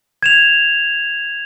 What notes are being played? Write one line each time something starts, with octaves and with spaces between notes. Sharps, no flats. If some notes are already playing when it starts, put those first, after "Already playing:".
G#6 E7 F7